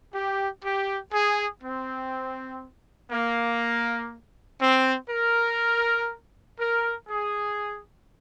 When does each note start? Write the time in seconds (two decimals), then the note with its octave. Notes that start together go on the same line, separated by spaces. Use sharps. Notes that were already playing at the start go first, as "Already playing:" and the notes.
0.14 G4
0.64 G4
1.13 G#4
1.62 C4
3.11 A#3
4.60 C4
5.09 A#4
6.59 A#4
7.09 G#4